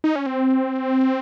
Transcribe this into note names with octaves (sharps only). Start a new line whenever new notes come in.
D#4
C#4
C4